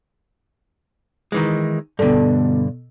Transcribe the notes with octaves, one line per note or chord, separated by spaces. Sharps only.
D#3 E3 G#3
G2 B2 D3 A4